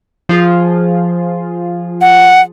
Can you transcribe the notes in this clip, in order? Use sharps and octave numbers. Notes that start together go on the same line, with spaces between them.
F3 F4 G#4
F#5